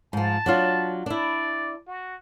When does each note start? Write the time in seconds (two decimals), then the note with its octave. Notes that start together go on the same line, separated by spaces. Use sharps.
0.13 G#2 F3 A5
0.46 F#3 D4 F4
1.06 D4 E4 D5
1.87 F#4